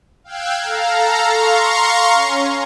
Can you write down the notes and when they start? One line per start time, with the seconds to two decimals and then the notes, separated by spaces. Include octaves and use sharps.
0.24 F5 G5 E6 F#6 G#6
0.61 A4 F5 A#5
1.28 F5 A#5 C6 C#6
2.14 C#4